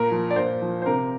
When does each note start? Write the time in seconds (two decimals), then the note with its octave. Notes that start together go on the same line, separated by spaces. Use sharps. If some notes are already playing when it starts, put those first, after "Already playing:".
Already playing: A#2 A#4
0.11 F3
0.31 D5
0.36 A#2 C5
0.62 F3
0.82 C5
0.86 C3 A#4